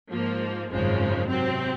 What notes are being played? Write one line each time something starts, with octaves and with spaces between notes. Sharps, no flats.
G#2 F3 A#3
G#1 F#2 C#3 F3 G#3
C3 F#3 C4